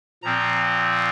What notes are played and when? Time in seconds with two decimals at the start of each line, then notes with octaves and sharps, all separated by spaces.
0.23 A#2 F3 C4 A#5